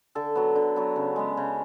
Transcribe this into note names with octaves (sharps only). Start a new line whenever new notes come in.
D3 A4
F#3 B3
D3
F#3 B3
C#3
G#3 B3
C#3